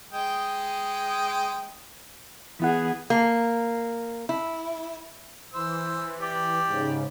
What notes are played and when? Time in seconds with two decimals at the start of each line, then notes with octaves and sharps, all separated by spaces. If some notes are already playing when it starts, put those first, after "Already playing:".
0.13 G#3 G5 D#6
2.60 E3 B3 E4 G#4 F#5
3.10 A#3
4.29 E4
5.54 E3 C5 E6
6.20 G4 D5
6.67 G#2 C#3